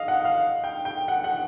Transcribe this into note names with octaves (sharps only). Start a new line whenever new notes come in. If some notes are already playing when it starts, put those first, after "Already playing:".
Already playing: D#5 F5
F#5
F5
G5
G5
F#5
F#5